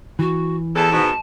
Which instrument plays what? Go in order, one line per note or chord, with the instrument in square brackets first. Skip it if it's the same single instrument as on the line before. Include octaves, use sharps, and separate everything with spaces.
[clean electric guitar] E3 [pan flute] F#4
[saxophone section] E2 A4 [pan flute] A5
[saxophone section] G#2 B2